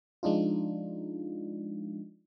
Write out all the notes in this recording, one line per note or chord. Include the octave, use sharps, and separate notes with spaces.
F3 G#3 D4 D#4 F4